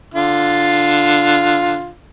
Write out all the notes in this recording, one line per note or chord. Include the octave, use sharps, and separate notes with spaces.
D3 F4